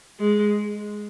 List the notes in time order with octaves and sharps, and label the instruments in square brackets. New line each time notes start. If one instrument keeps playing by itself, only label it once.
[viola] G#3